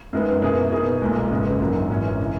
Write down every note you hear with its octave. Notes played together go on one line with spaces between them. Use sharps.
F#2 D#3 G#3 B3
B2 A#3 E4 G#4
B2 A#3 D#4 G#4
B1 A#2 G#3
G#1 F#2 C#3 G#3 B3
A#1 G#2 F#3 A#3
G#1 F#2 E3 G#3 C#4
C#3 E3